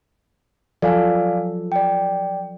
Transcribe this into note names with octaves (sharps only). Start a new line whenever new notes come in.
F3 F#3 A4 D5 F5 G#5
D5 G5